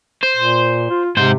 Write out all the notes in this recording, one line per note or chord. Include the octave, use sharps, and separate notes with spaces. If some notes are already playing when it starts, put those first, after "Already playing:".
C5
A#2
F4
G#2 C3 C5